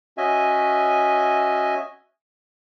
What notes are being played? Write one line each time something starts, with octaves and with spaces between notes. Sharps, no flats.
C#4 F#4 D#5 E5 G#5